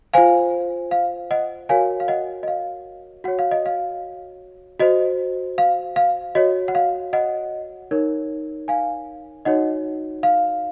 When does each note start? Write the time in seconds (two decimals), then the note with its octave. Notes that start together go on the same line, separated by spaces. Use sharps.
0.13 F4 C5 F5 G#5
0.91 F5
1.31 D#5 F#5
1.69 F#4 A#4 C#5 F5 G#5
2.00 F5
2.08 D#5 F#5
2.43 D#5
2.48 F5
3.24 F#4 C#5 F#5
3.39 F5
3.51 D#5
3.66 F5
4.80 F#4 C5 D#5
5.58 F5
5.96 F5
6.35 F#4 C#5 D#5
6.68 F#5
6.75 F5
7.13 D#5 F#5
7.91 D#4 A#4 C#5
8.68 F5 G#5
9.45 D#4 F#4 C#5 D#5 F#5
10.23 F5